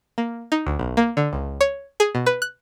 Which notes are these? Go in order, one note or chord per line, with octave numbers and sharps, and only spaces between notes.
A#3
D#4
D2
B1
A#3
D3
C#2
C#5
G#4
B2
B4
F#6